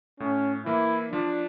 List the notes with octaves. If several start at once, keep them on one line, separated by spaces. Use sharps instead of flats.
A2 C#4
E3 A#3 E4
F3 D4